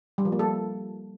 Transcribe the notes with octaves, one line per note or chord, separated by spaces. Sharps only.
G3
F3
A#3
A4